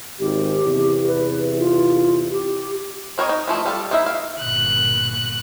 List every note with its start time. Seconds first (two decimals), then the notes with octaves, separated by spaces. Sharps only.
0.20 G#1 G4
0.64 E2 C3 E4
1.07 B4
1.59 F4
2.31 G4
3.18 C4 A#4 C5 C#5 D#5
3.29 D#4
3.48 E3 F3 A3
3.66 G3 F4 A4
3.91 A#3 D#4 E4 B4 E5
4.06 F5
4.40 G1 A#2 F#6